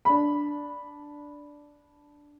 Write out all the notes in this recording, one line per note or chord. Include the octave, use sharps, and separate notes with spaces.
D4 B5